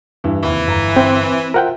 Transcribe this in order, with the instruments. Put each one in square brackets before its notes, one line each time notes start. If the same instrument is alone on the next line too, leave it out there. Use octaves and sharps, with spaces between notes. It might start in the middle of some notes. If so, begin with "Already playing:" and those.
[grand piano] G2 E3
[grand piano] D#2 C3 [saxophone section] E3
[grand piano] G1 A#5
[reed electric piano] C4
[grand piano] F4 C5 E5 [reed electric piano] A#4 F#5 G5